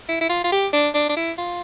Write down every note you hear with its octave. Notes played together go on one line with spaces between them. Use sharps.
E4
E4
F4
F4
G4
D4
D4
D4
E4
F4